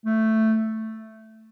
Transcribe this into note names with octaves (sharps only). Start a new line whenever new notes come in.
A3